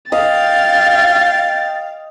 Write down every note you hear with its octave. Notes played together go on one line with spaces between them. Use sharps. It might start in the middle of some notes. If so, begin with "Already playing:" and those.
D#5 F5 G5 A6